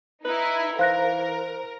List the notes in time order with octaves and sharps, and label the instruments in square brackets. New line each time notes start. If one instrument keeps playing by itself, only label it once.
[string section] D#4 E4 [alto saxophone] B4
[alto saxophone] E3 [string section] A#4 [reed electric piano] C5 [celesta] F5 F#6 A#6